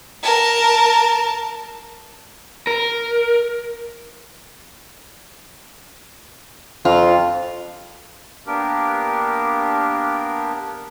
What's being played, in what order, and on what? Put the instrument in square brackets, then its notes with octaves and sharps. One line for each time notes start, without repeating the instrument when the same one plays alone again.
[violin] A#4 A5
[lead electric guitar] A#4
[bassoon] F2 [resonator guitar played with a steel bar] F4
[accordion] A#3 B3 D4 G4 A#4